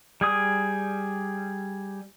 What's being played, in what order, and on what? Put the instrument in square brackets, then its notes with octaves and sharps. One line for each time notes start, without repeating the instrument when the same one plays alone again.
[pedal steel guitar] G3 G#4 D#6